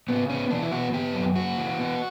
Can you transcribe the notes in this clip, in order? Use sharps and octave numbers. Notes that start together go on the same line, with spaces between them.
C#3 B3
B3 C#4
E3 D4
E4
B3 F#4
B3 G4
F#2
C#3 F#4
E3
B3